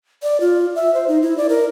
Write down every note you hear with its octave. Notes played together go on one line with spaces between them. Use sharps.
D5
F4
E5
C5
D#4
E4
D5
A#4